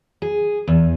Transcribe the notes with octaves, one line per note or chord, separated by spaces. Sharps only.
G#4
E2